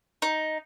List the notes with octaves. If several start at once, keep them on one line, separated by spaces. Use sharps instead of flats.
D#4